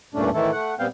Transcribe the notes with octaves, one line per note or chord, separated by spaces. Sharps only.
E2 G2 A#2 A3 C#4 D4
A2 D#3 E3 A3 E4 A4
A3 F#5
A#2 G3 B3 C4 F5 G5